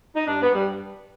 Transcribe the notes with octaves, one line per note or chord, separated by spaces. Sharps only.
D#4
G2 D4
B3
G2
G3